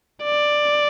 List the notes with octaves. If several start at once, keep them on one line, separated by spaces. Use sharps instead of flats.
D5